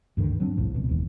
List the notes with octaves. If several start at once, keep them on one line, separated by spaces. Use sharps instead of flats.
D2 G2 D3 D#3
F#3 C4 D4
F#1 C2 A2 F3
C#2 B2
E1 D#2